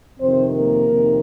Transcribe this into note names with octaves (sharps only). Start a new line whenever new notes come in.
F2 C3 D#3 C4 C5
A#3 A#4
F2 C3 D#3